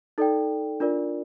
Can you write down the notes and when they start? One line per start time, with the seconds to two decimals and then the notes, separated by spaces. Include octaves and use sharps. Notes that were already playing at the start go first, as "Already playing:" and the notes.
0.18 D#4 A4 D5 G5
0.80 D4 F4 A#4 D5